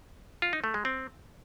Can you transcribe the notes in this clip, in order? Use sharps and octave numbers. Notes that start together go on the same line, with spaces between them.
F4
D#4
A3
G#3
C4